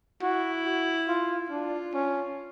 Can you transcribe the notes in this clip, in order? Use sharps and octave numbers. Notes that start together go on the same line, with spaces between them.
E4 F#4
F#4
F4
D4 F4
C#4